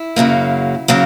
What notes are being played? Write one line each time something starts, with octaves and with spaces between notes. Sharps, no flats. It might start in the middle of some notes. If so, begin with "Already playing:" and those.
Already playing: E4
F#2 C#3 F#3 A#3
C#3 F#3 A#3